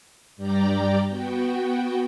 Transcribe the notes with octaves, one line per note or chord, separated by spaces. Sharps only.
G2 G3 D5 G5 A#5 D6
B3 F#4 G5